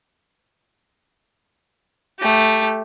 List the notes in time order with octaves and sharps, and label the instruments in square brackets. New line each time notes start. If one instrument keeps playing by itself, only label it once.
[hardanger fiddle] A3 G4